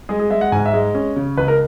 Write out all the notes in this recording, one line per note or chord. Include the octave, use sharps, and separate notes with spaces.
G#3 G#4
G#4
G#3 E5
F#5
G#2 G#5
E5
G#3
C#4
C#3
C#2 B4
A#4